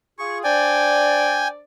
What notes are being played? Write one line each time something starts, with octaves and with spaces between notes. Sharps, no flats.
F4 G#4 C#6
D4 C5 D5 G5 G#5